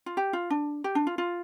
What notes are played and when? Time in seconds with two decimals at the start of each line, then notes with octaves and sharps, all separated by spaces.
0.06 F4
0.17 G4
0.33 F4
0.50 D4
0.84 G4
0.95 D4
1.07 F4
1.18 F4